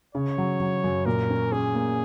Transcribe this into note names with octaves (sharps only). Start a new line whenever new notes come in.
C#3 C#5
F#3
F#3
F#2
A#2 A#4
C#4
C#4 G#4
A#3